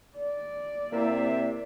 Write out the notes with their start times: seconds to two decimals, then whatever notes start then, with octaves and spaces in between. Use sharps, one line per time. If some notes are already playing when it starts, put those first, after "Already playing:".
0.17 D5
0.92 C3 A#3 E4 A#4 E5